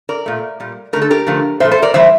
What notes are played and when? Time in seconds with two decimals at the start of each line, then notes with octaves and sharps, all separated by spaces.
0.09 A#4 D5
0.26 A#2 A3
0.60 A#2 G3
0.93 D3 A3 A#4
1.02 A4
1.11 G4 A#4
1.27 D3 F3 A3
1.60 A#2 F3 A3 C5 E5
1.71 A4 C5
1.82 A#4 D5
1.94 A2 E3 G3 C5 E5